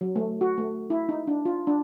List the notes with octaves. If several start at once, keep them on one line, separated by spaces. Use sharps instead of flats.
F#3
A3
F#4
A3
E4
D#4
D4
F4
D4